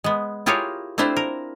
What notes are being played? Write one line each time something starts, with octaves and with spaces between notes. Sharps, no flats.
G#3 B3
E4 F4 G4 G#4 A#4 C#5
A3 C4 D4 E4 F4 C5
A#4